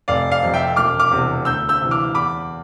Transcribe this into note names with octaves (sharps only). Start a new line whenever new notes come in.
F1 D5 F5
D5 F5
F2 C3
E5 G5
E1 D6 F6
D6 F6
E2 C3
D2 E6 G6
E6 G6
C3 E3
D6 F6
E2 B5 D6